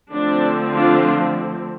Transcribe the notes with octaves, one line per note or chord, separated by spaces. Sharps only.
D3 F3 A3 C4 D4
D4 F4